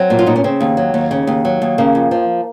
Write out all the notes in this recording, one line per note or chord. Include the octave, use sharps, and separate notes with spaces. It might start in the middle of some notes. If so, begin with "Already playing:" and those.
Already playing: F#3 C4
A#2
F4
A#2 D#4
C#4
C#3 C4
D#2
F#3
D#2
C#3
D#2
F#3
D#2
C#3 A#3
F2
F3